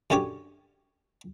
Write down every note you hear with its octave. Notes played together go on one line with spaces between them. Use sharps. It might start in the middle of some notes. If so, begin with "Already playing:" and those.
F#2 D3 C#4 G4 C#5 D6